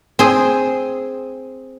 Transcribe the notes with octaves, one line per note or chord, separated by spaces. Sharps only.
C4 G#4